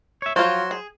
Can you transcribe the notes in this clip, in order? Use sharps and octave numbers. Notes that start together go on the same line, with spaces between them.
C#5 E5
F3 F#3 F4 C5
G#4